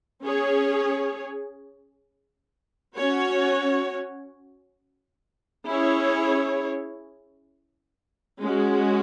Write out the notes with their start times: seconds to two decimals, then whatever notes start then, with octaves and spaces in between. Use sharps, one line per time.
0.24 C#4 G#4 C#5
2.97 C#4 F#4 C#5
5.69 C#4 E4 G#4 C#5
8.41 G#3 C#4 F#4